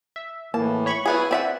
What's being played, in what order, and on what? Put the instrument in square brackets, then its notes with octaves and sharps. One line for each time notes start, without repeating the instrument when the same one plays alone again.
[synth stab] E5
[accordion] A2 E3 [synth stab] A#3 [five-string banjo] A5
[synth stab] C#5 B5 C#6
[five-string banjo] F#3 B3 G#4 [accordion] E4 B4 G#5
[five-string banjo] C4 E5 F#5 [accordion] D5